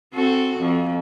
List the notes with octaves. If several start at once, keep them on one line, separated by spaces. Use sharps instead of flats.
C4 F#4 A4
F2